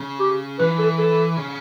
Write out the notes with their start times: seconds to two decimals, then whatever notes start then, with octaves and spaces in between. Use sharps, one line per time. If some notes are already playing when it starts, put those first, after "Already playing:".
Already playing: C#3
0.19 G4
0.59 E3 B4
0.79 A4
0.99 A4
1.37 C#3